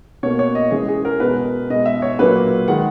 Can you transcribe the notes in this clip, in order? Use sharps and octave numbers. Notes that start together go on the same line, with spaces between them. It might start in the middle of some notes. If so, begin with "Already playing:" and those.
B2 A#3 C#5
C#5
D#5
C#3 E3 G#3 G#4
G#4
A#4
B2 G#3 B4
B2 G#3 D#5
E5
C#5
A#2 F#3 A#3 B4
D#3 G#3 F#5